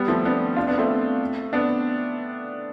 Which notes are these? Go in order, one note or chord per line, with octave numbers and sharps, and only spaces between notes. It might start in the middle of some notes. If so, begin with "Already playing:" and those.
Already playing: G3 B3
F3 A3
B3 D4
D4 F4
B3 D4
A3 C4
B3 D4